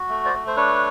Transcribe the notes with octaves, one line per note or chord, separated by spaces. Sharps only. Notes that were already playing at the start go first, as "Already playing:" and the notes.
Already playing: F#4
A3
C5 D5
A3
C5
D4 B4 C#5